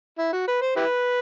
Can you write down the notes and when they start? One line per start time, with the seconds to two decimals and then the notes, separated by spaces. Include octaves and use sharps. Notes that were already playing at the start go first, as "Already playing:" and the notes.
0.19 E4
0.33 F#4
0.47 B4
0.61 C5
0.76 E4 G4 B4